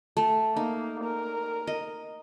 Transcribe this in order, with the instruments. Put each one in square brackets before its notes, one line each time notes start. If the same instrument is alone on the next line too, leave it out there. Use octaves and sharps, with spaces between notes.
[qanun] A3
[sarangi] A#3 [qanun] D#4
[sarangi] A#4
[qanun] D#5